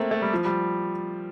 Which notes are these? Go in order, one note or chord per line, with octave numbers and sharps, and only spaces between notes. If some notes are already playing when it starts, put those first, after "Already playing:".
Already playing: A3 A#3 C4
A3
G3
F3
G3